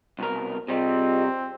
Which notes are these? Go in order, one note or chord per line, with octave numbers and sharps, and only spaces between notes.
C2 B2 A#4
C3 G3 C4 F4 G#4 D#5